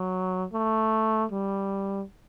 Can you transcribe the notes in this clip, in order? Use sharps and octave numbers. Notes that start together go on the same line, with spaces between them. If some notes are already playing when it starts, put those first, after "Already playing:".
Already playing: F#3
A3
G3